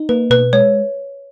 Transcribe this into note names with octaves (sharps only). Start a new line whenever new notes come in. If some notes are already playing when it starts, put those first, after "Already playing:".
Already playing: D#4
A#3 B4
B2 B4
G#3 C#5